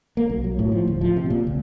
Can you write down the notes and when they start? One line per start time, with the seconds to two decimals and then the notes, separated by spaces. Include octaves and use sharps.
0.17 A#3
0.29 B1
0.44 F#3
0.59 A2
0.72 F3
0.87 D1
1.01 F3
1.16 C3
1.30 A#2
1.47 C#2